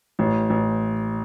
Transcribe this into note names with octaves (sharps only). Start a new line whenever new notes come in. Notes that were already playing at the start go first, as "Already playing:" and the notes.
A1
A1